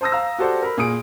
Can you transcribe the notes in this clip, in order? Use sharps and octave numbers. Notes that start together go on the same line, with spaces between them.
C5 A5 D#6 E6 A#6
F5 A#5 E6
F#4 G4 A4 C5 D5 F#5
A#4 B5
A#2 G#4 D#6 D7